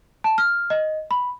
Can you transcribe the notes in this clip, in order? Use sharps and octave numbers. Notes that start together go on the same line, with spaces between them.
A5
F6
D#5
B5